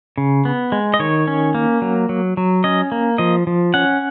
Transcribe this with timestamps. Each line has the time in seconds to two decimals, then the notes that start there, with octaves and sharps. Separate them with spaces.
0.18 C#3
0.45 B3
0.72 G#3
0.94 D#5
0.99 D#3 C#5
1.27 C#4
1.55 A#3
1.82 F#3
2.09 F#3
2.37 F#3
2.64 C#4 D#5
2.92 A#3
3.18 F3 D#5
3.47 F3
3.74 C#4 F#5